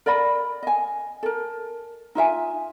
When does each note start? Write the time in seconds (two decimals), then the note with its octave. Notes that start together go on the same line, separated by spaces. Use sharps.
0.06 A#4 D5 D#5 B5
0.63 D#5 G#5
1.23 A4 A#4
2.15 D#4 F4 E5 G#5